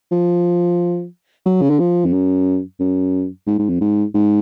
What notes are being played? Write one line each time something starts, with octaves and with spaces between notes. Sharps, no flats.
F3
F#3
C#3
D3
F3
F2
F#2
F#2
G#2
G#2
F2
G#2
G#2